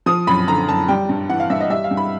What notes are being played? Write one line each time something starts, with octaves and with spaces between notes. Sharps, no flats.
F3 D#6
F#2 B5
D3 A#5
F#2 A5
G3 G5
G2
E3 F#5
F5
G2 E5
D#5
G3 E5
F5
G2
B5